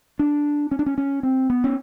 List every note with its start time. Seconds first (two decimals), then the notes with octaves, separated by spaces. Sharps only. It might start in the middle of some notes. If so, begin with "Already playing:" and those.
0.19 D4
0.71 C#4
0.79 D4
0.86 C#4
0.98 C#4
1.23 C4
1.50 B3
1.64 C#4